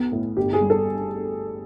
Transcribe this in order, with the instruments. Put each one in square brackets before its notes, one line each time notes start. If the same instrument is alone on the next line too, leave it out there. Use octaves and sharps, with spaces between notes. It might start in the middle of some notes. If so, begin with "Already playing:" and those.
Already playing: [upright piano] B1 B3
A2
G1 G4
G#4
G3
A4